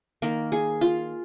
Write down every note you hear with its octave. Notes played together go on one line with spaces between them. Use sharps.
D#3 A#3 A#4
G#4
F4